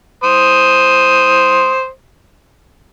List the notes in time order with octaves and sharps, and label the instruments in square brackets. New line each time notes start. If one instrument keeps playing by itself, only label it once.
[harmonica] C5 D#6